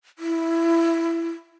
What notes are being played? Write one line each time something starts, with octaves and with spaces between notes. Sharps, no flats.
E4